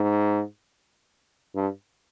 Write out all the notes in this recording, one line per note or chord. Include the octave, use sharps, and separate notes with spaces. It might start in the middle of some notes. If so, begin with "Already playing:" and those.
Already playing: G#2
G2